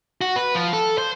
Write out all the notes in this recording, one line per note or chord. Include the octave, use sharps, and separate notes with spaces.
F#4
B4
F3
A4
C5